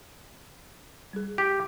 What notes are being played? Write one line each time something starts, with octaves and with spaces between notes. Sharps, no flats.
G3 G#4
G4